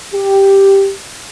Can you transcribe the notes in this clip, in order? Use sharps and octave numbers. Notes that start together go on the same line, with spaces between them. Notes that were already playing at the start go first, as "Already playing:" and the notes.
G4